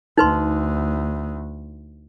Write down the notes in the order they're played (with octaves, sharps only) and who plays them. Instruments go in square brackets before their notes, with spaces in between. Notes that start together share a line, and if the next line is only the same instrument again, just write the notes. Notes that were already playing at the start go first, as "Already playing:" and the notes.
[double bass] D2 [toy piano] D#4 B4 C6